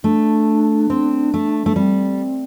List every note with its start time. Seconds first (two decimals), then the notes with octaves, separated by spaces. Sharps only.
0.04 A3 D4
0.90 C4
1.34 A3
1.66 A3
1.76 G3 C4